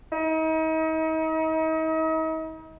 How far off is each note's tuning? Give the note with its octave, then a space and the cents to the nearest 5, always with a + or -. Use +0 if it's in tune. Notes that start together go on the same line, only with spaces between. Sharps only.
D#4 +40